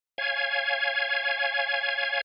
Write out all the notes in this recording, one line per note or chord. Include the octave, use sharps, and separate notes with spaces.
C#5 F5 G#5 G#6